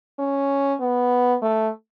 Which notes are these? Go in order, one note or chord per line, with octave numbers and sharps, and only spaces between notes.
C#4
B3
A3